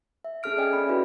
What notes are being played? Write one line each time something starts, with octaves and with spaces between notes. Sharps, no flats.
E5
C#4 G#4 A4 E5 F6 D7
D5 D#5 G5 G#5
C#4 G5 B5
E4 F#4 B4 D5 E5